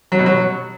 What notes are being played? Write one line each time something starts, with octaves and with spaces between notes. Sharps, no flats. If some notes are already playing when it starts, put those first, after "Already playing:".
F#3
B2
F#3